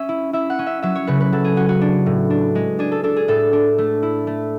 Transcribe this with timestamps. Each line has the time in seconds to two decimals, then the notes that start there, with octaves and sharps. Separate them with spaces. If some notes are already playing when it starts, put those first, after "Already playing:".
Already playing: C#4 E5
0.09 E4
0.33 E4 E5
0.50 F#5
0.59 C#4
0.66 E5
0.82 F#3 E5
0.95 C#5
1.07 C#3 B4
1.20 B4
1.33 F#3 A4
1.44 G#4
1.56 C#4 F#4
1.69 F#4
1.81 D4
2.06 A2
2.30 D4
2.55 G#3
2.79 D4 G#4
2.92 A4
3.03 D4 A4
3.16 G#4
3.28 A2 A4
3.53 D4
3.78 A3
4.03 E4
4.27 A3